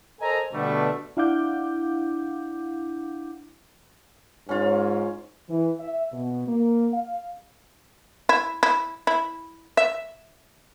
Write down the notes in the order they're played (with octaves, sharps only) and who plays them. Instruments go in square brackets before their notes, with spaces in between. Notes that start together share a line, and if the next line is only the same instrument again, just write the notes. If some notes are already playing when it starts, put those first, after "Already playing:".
[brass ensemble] A4 A#4 C5 D#5 G#5 A#5
B2 D3 G3 A3
[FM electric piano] D4 E4 F5 F#5 D6 G6
[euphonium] G#2 [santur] C#4 F4
[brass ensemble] E3
E5
B2
A#3
F5
[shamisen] E4
E4
E4
E5